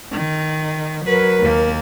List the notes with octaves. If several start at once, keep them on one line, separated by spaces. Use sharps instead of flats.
D#3
F#3 A#4 B4
D#2 A#3